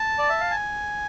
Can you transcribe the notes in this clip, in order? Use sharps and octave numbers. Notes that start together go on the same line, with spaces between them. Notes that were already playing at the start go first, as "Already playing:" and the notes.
Already playing: A5
D5
E5
F5
G#5